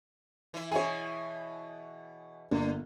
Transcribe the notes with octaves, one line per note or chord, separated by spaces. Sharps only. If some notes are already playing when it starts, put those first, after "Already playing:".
E3 E4
B2 E3 G#4 C#5 E5 G#5
G1 G2 A#3 D4